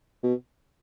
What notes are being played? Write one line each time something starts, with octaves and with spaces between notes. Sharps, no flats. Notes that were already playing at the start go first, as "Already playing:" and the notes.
B2